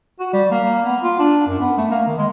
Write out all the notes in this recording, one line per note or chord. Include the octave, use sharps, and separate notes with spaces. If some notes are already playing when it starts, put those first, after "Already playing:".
F#4
G3
A#3
B3
F4
D4
F#2
B3
A3
A#3
D#3
G#3